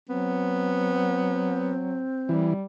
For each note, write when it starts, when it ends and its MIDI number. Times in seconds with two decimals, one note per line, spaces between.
0.09 2.03 54
0.09 1.73 59
0.09 2.54 60
2.29 2.54 52
2.29 2.64 55